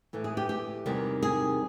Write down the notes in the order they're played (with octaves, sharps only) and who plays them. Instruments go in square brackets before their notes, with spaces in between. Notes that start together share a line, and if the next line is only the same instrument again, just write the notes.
[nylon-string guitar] A2 E3 A3
G#4
G4
G4
E2 C3 D#3 G3
G#4